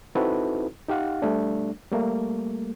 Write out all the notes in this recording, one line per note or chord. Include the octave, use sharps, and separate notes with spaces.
C4 D#4 E4 F#4 A4 B4
D#4 G4 F5 F#5
G3 A3 D4
G3 A3 A#3